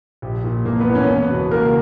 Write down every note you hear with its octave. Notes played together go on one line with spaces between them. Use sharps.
A#1 G4
A#2
E1 A#3 A#4
B3 B4
E2
C#4 C#5
E2 B3 B4
B2
C#2 A#3 A#4